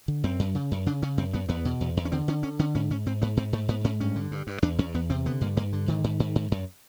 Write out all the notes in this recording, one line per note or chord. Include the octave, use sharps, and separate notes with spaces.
D3
F#2 C4
F#2
C#3
F#2
C#3 D4
C#3 C#4
F#2 C4
F#2 B3
E2 B3
B2
E2
E2
C#4
D3 C4
D3 C#4
D3 C#4
D3 C#4
G#2 C#4
G#2 C#4
G#2 C4
G#2 B3
G#2 C4
G#2 A3
G#2 B3
G#2 C#4
G2 C#4
D3
G2
G2
E2 D4
E2 C#4
E2 B3
C3 C4
D3 B3
G2 A#3
G2 A#3
D3
G#2 D#3
G#2
G#2
G#2
F#2